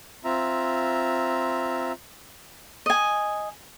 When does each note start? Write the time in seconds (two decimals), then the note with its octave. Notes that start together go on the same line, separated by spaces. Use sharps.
0.24 C4 F4 E5 A#5
2.86 D#5 G#5